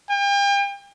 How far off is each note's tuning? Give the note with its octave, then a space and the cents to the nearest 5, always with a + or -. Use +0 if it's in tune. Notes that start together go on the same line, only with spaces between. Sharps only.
G5 +40